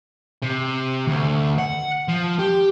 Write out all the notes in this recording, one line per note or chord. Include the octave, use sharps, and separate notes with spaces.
C3
D2
F#5
F3
G4